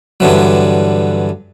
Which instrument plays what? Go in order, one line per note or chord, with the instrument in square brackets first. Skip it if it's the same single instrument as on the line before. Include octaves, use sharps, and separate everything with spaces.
[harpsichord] G2 D3 E3 F#3